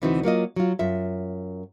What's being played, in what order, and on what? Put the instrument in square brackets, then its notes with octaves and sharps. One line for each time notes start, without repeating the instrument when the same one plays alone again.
[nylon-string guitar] D2 C3 E3 C4 D#4 F#4
F#3 A#3 F4 D#5
F#3 F4
F#2 F4 E5